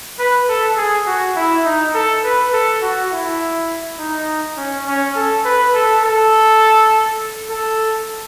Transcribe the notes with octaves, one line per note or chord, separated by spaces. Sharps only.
B4
A4
G#4
F#4
E4
D#4
A4
B4
A4
F#4
E4
D#4
C#4
C#4
A4
B4
A4
A4
A4